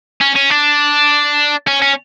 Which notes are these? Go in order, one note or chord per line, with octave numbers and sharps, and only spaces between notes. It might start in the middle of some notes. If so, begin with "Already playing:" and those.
C#4
C#4
D4
C#4
C#4